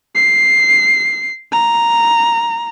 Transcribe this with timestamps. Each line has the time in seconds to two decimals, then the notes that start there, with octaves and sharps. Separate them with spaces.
0.15 C7
1.52 A#5